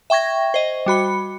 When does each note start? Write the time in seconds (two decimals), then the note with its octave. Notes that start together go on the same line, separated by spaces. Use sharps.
0.10 E5 G5 C#6 G#6 A#6
0.54 C5 D#5
0.86 G3 F#4 B5 C#7